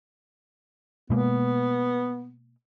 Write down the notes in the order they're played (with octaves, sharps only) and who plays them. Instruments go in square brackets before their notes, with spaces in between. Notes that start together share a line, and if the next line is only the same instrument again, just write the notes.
[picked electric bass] B2 G#3 A#3 [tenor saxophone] B3